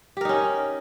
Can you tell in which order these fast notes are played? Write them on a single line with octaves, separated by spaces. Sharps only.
G4 A#4 D#4 C#4